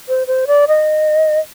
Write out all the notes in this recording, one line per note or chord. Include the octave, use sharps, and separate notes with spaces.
C5
C5
D5
D#5